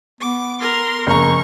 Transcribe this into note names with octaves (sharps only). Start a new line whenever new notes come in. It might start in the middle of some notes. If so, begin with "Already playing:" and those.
B3 D6
A#4 C6
F#1 F3 A#5 C#6